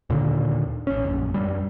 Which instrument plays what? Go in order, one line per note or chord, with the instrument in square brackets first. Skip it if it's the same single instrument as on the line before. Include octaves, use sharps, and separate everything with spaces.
[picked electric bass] D#2 A#2 D3
A1 C#4
A#1 F#2
F#2 G3